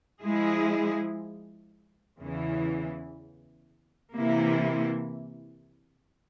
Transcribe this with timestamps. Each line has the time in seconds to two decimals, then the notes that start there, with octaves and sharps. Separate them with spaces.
0.22 F3 G#3 E4 G#4
2.18 E2 C#3 E3
4.14 C3 E3 A#3 E4